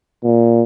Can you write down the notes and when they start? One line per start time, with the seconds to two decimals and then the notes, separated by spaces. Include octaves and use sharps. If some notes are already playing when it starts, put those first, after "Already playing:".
0.24 A#2